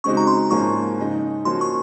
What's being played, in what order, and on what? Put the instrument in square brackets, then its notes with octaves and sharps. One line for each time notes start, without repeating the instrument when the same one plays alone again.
[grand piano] C#3 G#3 C4 D#4 F#4 [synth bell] C#6
[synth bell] A#5
C6
[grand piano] G#2 F3 A#3 C#4 [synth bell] C#6
[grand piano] C#3 G#3 D#4
[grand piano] F3 A#3 C#4 F#4 [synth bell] C6
[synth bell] C#6